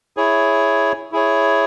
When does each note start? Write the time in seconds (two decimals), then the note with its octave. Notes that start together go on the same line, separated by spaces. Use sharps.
0.17 E4 G#4 C#5
1.12 E4 G#4 C#5